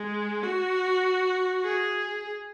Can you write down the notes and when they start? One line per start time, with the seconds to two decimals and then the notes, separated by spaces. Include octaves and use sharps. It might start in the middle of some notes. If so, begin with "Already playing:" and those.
Already playing: G#3
0.43 F#4
1.64 G#4